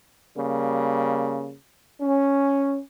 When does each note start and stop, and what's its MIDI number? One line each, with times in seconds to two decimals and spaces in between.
0.37 1.54 49
0.37 1.54 55
0.37 1.54 58
2.01 2.81 61